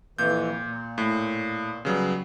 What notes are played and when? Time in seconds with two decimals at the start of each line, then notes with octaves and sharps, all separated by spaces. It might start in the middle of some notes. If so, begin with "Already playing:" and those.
0.18 F2 A#2 E3 G6
0.68 A#2
0.98 A2
1.85 C#3 F#3 G3 B3